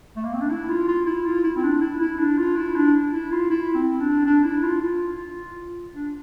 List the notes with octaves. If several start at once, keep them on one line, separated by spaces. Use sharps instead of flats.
A3
A#3
C4
D4
E4
F4
F4
E4
F4
E4
C4
D4
E4
E4
D4
F4
E4
D4
E4
F4
E4
C4
D4
D4
E4
F4
F4
D4